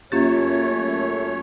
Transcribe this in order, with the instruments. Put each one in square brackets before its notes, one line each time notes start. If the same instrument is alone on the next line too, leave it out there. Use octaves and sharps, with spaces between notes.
[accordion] F#2 A3 C#5 [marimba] A#3 C#4 G4 [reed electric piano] F4 A6